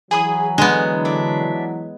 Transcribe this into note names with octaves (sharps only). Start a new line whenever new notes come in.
E3 F#3 G#4 G#5 B5 D#6
D3 G#3 B3
D4 E5